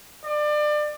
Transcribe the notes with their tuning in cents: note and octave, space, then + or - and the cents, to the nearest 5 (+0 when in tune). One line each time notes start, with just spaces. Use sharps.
D5 +30